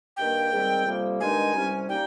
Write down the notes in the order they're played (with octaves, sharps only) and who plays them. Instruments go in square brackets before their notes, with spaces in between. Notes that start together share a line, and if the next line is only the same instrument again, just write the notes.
[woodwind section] G2 D#3 A#3 [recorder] G5
[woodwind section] G#2 D#3 G3 C4
F2 C3 G3 A#3
[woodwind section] G2 D#3 G#3 D#4 [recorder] G#5
[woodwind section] C2 C3 G3 C#4
[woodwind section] G3 A#3 D#4 [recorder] G5